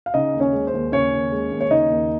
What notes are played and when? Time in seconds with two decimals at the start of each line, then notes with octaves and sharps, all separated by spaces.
0.06 F5
0.14 C#3 D#4 D#5
0.34 D#2
0.40 C#4 C#5
0.53 G#3
0.67 C5
0.73 D#2
0.92 C#3 C#4 C#5
1.12 D#2
1.32 G#3
1.51 D#2
1.60 C#5
1.70 C#3 D#4 D#5
1.90 D#2